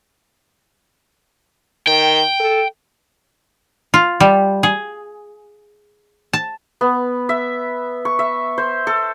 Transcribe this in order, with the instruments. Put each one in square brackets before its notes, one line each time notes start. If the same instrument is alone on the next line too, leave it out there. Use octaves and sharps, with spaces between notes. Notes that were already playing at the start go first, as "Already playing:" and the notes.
[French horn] D#3 [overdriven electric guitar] G5
[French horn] A4
[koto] F4
G3
G#4
A5
[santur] B3
E5
C#6
E5
C5
A4